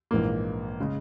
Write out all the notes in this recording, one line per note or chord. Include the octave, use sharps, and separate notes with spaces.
A#1 G#2 E3 A#3
C#3 G#3